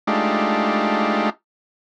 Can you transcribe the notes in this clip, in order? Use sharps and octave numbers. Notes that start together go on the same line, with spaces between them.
G#3 A3 D4 D#4 F4 G4